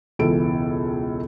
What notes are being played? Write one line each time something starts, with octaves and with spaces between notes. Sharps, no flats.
E1 C#2 E3 A4 D7